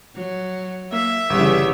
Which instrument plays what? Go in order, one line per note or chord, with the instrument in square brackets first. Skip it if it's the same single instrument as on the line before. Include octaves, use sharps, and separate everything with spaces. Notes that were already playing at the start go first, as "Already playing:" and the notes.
[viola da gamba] F#3
[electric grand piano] A#3 [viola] E5
[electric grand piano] G1 [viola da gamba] C#3 E3 G3